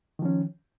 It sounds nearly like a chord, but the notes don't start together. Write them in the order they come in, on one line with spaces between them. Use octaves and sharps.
D#3 F3 C#4